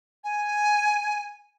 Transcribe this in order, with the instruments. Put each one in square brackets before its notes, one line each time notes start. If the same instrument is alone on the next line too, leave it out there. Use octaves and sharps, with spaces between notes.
[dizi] G#5